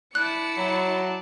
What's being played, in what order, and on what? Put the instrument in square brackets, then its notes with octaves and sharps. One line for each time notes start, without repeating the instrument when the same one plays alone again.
[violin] E4 C#7 [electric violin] D5 A5 [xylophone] F#6
[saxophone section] F#3